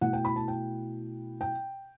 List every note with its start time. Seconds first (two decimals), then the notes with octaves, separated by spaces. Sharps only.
0.01 B2 A3 E4 F#5
0.13 G5
0.25 B5
0.36 A5
0.48 G5
1.41 G5